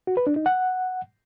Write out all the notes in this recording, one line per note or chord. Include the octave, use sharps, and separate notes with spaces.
F#4
B4
D4
D#4
F#5